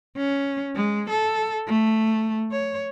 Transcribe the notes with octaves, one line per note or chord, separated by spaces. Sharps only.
C#4
G#3
A4
A3
C#5